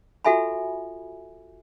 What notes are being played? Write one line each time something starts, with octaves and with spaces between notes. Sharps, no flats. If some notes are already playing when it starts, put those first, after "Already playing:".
F4 F#4 A4 E5 G#5 B5